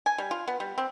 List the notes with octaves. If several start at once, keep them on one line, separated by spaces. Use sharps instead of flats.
G#5
G3
F4
B3
G3
C4